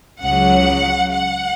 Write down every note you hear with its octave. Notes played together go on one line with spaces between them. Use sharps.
C#2 C#3 F#3 F#5
F#5